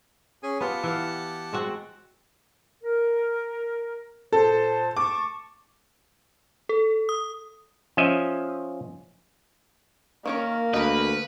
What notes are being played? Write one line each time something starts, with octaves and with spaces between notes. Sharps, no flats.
C#4 G#4 G#5
B3 F4 G4 F#5 A5
E3 F5
G#3 C4 F#4
A#4
A#2 A4 C5
A5 C#6 D6
A4
D#6
F3 C#4 D#5 E5
D#3 A#3 C#4 A#4
D2 A#4 B4 D#5